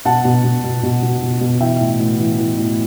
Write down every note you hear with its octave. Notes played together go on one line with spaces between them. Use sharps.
B2 F#5 A5
B2
B2
B2
B2
B2
B2
B2
E3 E5 G5
A2
A2
E3
E3
A2